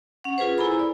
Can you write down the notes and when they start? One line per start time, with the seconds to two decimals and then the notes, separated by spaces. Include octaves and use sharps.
0.24 C#4 F#5
0.38 F4 G#4 B4 C5
0.58 E4 A4 G#5 A#5 B5
0.79 D5